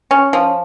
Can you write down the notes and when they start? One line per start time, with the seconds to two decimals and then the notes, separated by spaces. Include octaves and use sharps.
0.11 C#4
0.33 F3